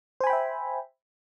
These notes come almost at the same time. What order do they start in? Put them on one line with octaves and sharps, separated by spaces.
C5 G#5 B5 G5 E5